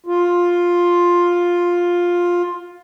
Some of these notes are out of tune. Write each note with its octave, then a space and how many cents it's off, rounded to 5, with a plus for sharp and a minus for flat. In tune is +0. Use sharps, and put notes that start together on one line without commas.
F4 +5